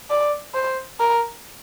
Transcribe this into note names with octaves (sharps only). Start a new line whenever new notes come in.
D5
C5
A#4